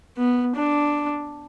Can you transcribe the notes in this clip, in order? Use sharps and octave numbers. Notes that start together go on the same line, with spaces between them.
B3
D4